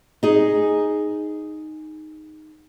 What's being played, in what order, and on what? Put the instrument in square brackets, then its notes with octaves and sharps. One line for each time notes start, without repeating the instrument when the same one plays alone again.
[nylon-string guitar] D#4 G#4